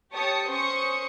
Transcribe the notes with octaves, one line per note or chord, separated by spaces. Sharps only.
G4 C#5 A5 D#6 C#7
C#4 C5 C#6 D#6 C#7